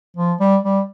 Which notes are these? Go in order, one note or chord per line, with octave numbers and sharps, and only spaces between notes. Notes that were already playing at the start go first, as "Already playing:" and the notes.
F3
G3
G3